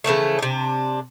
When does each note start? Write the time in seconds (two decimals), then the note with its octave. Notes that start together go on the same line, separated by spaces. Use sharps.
0.04 C#3 E3 F3 A3
0.39 C3 D4